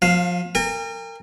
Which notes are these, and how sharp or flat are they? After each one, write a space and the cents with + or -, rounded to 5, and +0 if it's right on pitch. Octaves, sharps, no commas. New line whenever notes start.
F3 +30 F5 +0
A#4 -30 G5 +45